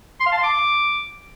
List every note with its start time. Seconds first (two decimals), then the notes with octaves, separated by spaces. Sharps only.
0.20 C6
0.26 F5
0.32 A5
0.38 C6
0.43 D6